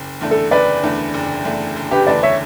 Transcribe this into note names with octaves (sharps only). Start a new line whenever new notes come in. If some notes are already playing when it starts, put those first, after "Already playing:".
Already playing: F#1
E2 D3 A3 D4
A4
F#1 B4 D5
E2 D3 A3 D4
F#1
E2 D3 A3 D4
F#1
G4 B4
E2 D3 A3 D4 B4 D5
C#5 E5